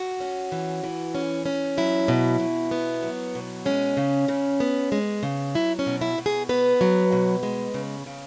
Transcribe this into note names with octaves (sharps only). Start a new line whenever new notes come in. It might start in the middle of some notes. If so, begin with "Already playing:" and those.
Already playing: F#4
C#4
E3
E3
C#4
C#4
F#3 E4
B2
B2
B3
F#3
B2
G#3 C#4
C#3
C#3
B3
G#3
C#3
F#3 E4
C#4
B2
E4
B2
G#4
B3 B4
F#3
B2
G#3
C#3
C#3